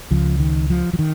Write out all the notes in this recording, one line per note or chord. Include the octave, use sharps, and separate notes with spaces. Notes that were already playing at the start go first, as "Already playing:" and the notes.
C#2 C#3 F3
D#3
F3
F3
D#3